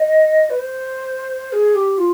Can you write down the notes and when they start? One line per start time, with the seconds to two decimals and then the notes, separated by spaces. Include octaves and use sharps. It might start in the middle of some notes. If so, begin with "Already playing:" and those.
Already playing: D#5
0.49 B4
0.58 C5
1.52 G#4
1.74 G4
1.98 F4